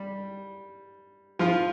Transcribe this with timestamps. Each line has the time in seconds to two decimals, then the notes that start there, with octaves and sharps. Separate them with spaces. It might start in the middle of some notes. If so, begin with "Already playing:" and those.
Already playing: G3
1.39 F3 F4